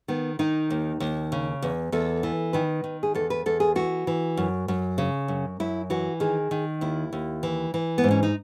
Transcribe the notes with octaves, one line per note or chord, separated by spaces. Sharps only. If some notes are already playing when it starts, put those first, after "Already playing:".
D#3 B3
D#3 D#4
D#2
D#2
C#3
E2
E2 A4
E3
D#3 B4
D#3
G#4
E2 A4
B4
E2 A4
G#4
E3 F#4
E3
F#2
F#2
C#3
F#2
F#2 E4
E3 F#4
D#3 G#4
D#3
D#2 E4
D#2
E3
E3
B3
G#2
C#4
D#4